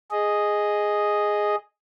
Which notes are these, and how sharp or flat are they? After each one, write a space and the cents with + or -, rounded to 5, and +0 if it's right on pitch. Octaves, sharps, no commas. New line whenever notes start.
G#4 +0 D#5 +0